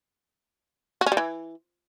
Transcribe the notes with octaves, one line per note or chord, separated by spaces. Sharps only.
F#4
C#4
G3
E3